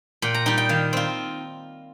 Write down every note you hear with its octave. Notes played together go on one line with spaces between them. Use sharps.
A#2 G5
A#5
G3 D#4 G5
G5
D#3 F5
C4 F4